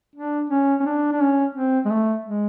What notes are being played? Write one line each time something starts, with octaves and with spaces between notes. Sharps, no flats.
D4
C#4
C#4
D4
D4
C#4
C4
G#3
A3
G#3